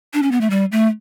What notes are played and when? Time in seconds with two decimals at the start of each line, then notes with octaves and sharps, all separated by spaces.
0.14 D4
0.23 C#4
0.32 B3
0.41 A3
0.50 G3
0.72 A3